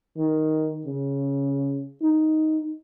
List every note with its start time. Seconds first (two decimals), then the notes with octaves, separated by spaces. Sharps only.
0.18 D#3
0.87 C#3
2.02 D#4